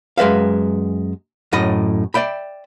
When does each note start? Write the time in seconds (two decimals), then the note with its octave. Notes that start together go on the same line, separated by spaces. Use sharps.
0.18 F#2 G#3 B4 E5 F5
1.53 F#2 A2 D#5 B5
2.14 D5 E5 G5 B5